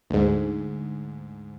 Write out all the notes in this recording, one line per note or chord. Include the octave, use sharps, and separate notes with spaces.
D2 G#2